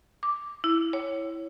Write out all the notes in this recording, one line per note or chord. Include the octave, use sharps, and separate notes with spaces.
D6
E4
C#5